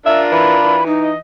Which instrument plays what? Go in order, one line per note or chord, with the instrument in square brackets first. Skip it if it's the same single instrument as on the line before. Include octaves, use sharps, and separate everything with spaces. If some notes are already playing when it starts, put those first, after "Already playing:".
[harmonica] D4 F4 A#4 [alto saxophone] E5
[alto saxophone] E3 [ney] B5
[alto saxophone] E3
[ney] D#4
[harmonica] D#5